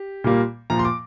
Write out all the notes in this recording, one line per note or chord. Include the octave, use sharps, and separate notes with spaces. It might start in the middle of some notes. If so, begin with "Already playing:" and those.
Already playing: G4
A#2 G3 A#3
A#2 F3 A#3 A#5
C6
D6